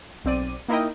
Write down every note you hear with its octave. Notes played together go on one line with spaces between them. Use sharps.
B1 C4 D5 D#7
A#3 D#4 E4 A#4 D#5 G5